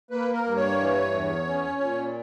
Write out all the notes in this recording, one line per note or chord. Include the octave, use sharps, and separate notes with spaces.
A#3 B4
A#4
G2
C#5
E3
E2
C#4
A#2